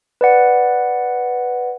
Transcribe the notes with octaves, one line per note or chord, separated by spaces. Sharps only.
B4 D5 F#5